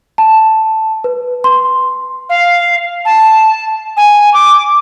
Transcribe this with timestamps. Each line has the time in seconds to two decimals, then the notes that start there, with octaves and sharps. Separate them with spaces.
0.18 A5
1.04 B4
1.44 C6
2.29 F5
3.05 A5
3.97 G#5
4.34 D6